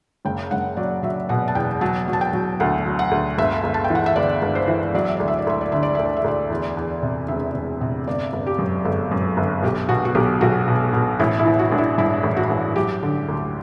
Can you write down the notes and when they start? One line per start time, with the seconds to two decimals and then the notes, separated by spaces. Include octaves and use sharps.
0.25 F#1 G5
0.51 F#1 F#5
0.77 F#3 D5
1.03 F#3 E5
1.29 B2 F#5
1.48 A5
1.55 E2 G5
1.81 F#3 A5
2.08 F#3
2.13 A5
2.21 G5
2.33 F#3
2.60 D2 F#5
2.86 F#3
2.99 F#5
3.11 D2
3.38 G1 E5
3.63 G1
3.74 A5
3.84 G5
3.90 E3
3.95 F#5
4.06 E5
4.16 G1 D5
4.42 G1
4.55 C5
4.68 E3
4.95 F#3 D5
5.05 E5
5.17 D2 D5
5.28 E5
5.38 D5
5.47 D2 E5
5.61 D5
5.72 D3 E5
5.83 D5
5.95 D2 E5
6.05 D5
6.17 E5
6.24 D2 D5
6.50 E2
6.77 E2
7.02 C3
7.28 E1 E5
7.55 E1
7.81 C3
8.07 G1 D5
8.33 G1
8.47 G4
8.58 F#2
8.85 G1 A4
9.11 F#2
9.37 G1
9.63 B1 G4
9.89 B2 F#4
10.05 F#4
10.15 B1 G4
10.41 B1 F#4
10.68 B2
10.93 B2
11.20 A1 E4
11.39 E4
11.46 E3
11.59 F#4
11.72 A1 D4
11.78 E4
11.98 G2 E4
12.23 A1
12.37 F#4
12.50 A1
12.75 F#3 G4
13.03 D3
13.28 D2